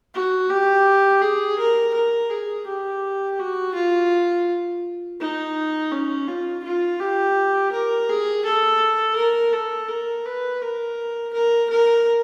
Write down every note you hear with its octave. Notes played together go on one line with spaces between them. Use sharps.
F#4
G4
G#4
A#4
A#4
G#4
G4
F#4
F4
D#4
C#4
F4
F4
G4
A#4
G#4
A4
A#4
A4
A#4
B4
A#4
A#4
A#4